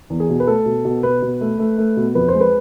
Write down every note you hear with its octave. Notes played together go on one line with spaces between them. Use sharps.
E2
G#4
B2
B4
A3 A4
B2
B2
B2 B4
B2
A3
A3
A3
B2
F2 B4
C5
G#3
B4